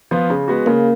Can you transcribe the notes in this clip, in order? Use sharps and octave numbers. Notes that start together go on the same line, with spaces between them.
F3 B3 F4
C#3
G#3 B3 F#4
C#3 A#3